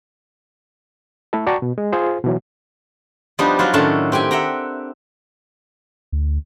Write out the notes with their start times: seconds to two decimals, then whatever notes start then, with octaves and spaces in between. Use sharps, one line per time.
1.33 A3 E4 A4
1.46 F#4 D5 G5 A5 A#5 C#6
1.62 B2
1.78 G#3
1.93 F4 G#4 C5
2.24 B2 E3 F#3
3.39 F3 G3 B3 D4 D#4 G4
3.59 F#3 F4 C5
3.74 A2 D#3 C#4 D4 E5 A5
4.12 C4 G4 G5 G#5
4.31 E5 F#5 G5 A#5
6.12 D2